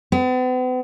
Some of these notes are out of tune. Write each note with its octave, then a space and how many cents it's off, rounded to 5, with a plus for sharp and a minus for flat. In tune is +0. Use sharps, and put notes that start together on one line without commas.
B3 +45